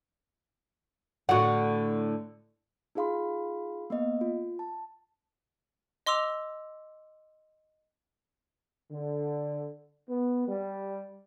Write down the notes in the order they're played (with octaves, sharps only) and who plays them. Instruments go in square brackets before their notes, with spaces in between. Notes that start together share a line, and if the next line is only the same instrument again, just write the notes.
[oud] A2 D3 [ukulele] F#4 F#5
[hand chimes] D#4 F4 G#4 F5 B5 C6
A#3 B3 D#5 F5
F4
A5
[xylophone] D#5 C6 D6 E6 F7
[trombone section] D3
B3
G3